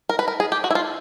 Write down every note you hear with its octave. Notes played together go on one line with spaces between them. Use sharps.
A#4
B4
A#4
G#4
G4
F#4
E4
F4